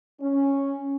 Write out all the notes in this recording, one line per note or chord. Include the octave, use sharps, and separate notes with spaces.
C#4